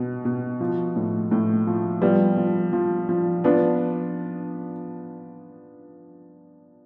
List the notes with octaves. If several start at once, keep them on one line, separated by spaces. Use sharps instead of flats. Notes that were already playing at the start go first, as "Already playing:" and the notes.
Already playing: B2
B2
F3
A2
A2
F3
F3 G3 B3
F3
F3
F3
F3 B3 D4